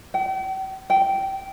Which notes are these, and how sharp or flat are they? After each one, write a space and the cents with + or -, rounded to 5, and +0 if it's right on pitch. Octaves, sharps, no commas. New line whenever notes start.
G5 -40
G5 -15